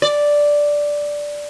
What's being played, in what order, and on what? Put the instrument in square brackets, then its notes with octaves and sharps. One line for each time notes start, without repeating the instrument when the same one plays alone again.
[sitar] D5